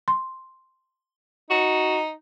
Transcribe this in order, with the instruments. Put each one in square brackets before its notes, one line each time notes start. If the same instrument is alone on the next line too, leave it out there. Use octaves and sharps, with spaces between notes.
[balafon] C6
[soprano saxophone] D#4 [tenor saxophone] F#4